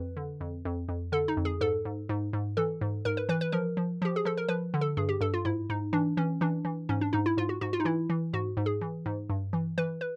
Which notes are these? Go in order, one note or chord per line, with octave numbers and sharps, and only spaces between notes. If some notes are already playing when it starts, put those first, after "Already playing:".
Already playing: F2 B4
D3
F2
F2
F2
D3 A4
D#4
F2
G#4
G#2 A4
G#2
G#2
G#2
E3 A4
G#2
G#2 A#4
B4
E3 B4
B4
F3 A#4
F3
F3 G4
G#4
F3 A4
A#4
F3 B4
D3
A4
G2 G#4
G4
G2 A4
F4
G#2 E4
G#2 D#4
E3 D4
E3 C#4
E3 D4
E3
G#2 C#4
D4
G#2 D#4
E4
G#2 F4
F#4
G#2 F#4
F4
D#4
E3 E4
E3
G#2 F#4
G#2
G#4
E3
G#2
G2
E3
E3 B4
B4